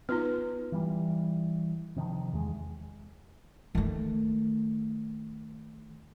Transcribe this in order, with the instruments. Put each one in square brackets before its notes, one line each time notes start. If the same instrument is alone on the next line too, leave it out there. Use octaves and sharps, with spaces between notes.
[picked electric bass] B3 [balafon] D#4 F4 B4
[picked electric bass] E3 G3
C3 D#3 F3
E2 G#3
[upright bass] D#3 A3